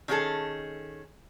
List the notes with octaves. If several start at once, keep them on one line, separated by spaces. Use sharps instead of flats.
D#3 C#4 F#4 G#4 A4